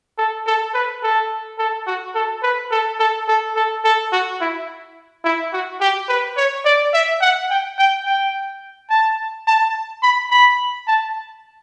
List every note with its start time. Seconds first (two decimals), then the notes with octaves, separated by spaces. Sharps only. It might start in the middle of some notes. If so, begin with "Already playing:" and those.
0.18 A4
0.46 A4
0.74 B4
1.03 A4
1.59 A4
1.87 F#4
2.15 A4
2.43 B4
2.71 A4
2.99 A4
3.28 A4
3.55 A4
3.84 A4
4.12 F#4
4.41 E4
5.25 E4
5.53 F#4
5.81 G4
6.09 B4
6.37 C#5
6.65 D5
6.94 E5
7.21 F#5
7.50 G5
7.78 G5
8.06 G5
8.90 A5
9.47 A5
10.02 B5
10.31 B5
10.87 A5